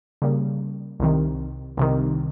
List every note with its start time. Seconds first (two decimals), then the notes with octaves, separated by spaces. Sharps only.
0.22 C#3 G3 A#3
1.00 C2 C3 D#3
1.77 C2 C3 D#3